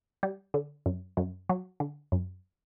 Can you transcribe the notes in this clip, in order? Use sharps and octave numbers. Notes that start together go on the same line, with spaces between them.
G3
D3
F#2
F#2
F#3
D3
F#2